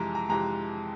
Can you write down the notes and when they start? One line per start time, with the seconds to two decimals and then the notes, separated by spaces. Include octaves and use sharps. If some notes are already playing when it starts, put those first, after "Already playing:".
Already playing: F2 C3 E3 G#3 A#5
0.15 A#5
0.29 F2 C3 E3 G#3 A#5